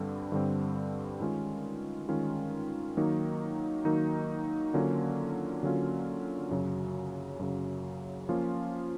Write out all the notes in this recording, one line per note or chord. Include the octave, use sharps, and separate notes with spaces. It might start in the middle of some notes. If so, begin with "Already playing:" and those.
Already playing: G2 D3 G3 C4
G2 D3 G3 C4
D#3 G#3 C#4 F4
D#3 G#3 C#4 F4
D#3 F#3 A#3 D#4
D#3 F#3 A#3 D#4
D3 F#3 A#3 C#4 F4
D3 F#3 A#3 C#4 F4
F#2 C#3 F#3
F#2 C#3 F#3
F3 A#3 C#4 F4